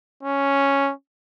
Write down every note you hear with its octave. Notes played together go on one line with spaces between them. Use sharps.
C#4